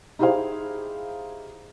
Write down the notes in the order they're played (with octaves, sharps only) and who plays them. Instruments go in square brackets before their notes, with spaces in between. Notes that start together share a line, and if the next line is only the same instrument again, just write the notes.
[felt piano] D#4 E4 G4 G#4 C5 F5